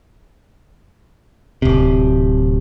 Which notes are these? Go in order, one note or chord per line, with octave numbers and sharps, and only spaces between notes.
D1 C3